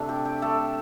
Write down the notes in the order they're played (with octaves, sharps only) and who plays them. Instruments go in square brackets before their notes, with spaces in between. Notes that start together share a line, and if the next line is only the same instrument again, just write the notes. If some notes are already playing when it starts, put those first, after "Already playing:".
Already playing: [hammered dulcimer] C3 A3 D4
G4
G4
A3 A4